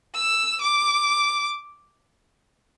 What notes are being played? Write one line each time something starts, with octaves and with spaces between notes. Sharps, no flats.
E6
D6